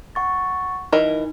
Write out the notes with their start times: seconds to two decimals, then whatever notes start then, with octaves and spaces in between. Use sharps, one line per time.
0.15 F#5 C#6 A6
0.93 E3 D#4 A#4 D#5